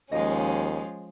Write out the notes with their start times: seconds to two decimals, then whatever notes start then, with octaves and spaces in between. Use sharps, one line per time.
0.12 D#2 F3 G#3 C#4 G#4 D#5